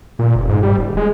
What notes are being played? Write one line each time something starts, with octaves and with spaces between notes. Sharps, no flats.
A#2
F1
G#2
G3
D#1
G#3